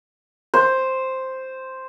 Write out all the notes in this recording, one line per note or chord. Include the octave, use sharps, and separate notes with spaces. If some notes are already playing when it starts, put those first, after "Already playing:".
C5